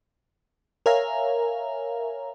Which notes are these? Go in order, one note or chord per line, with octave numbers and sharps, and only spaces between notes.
A#4 C#5 E5 F5 G#5 A#5